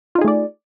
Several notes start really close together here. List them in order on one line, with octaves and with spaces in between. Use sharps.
F4 D#4 G#4 A3 D5